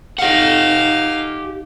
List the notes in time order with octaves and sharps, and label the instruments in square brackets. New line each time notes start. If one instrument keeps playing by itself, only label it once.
[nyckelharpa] D#4 F5 [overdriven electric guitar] G4 F#5